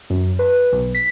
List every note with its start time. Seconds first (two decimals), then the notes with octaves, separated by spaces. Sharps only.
0.10 F#2
0.39 B4
0.72 B1
0.95 B6